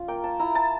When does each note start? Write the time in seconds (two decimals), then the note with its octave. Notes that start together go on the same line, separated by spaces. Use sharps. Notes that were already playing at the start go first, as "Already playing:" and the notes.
Already playing: C#4 F4
0.08 A#3 G5
0.24 A5
0.39 E4 A#5
0.55 A5